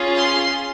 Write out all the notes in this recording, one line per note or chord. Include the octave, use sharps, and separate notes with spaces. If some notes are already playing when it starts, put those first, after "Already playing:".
Already playing: C#4 F4 G#4
C6